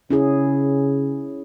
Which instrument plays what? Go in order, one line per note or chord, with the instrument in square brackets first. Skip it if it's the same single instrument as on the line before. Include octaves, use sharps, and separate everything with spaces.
[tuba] C#3 [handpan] C#4 E4 G#4